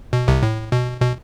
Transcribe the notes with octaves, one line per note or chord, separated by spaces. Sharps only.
B2
C2 C3
A2
B2
B2